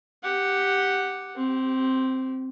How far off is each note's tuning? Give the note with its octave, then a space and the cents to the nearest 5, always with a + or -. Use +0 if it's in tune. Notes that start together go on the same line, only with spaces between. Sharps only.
G4 +0 F#5 +0
C4 +0 G4 -30